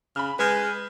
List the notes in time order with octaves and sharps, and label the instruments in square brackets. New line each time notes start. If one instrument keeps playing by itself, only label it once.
[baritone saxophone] C#3 [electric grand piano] B5 F6
[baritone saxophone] G#3 [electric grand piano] B4 F6 G6